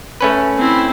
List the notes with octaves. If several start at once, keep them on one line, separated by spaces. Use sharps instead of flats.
A3 C#4 B4
C4 E4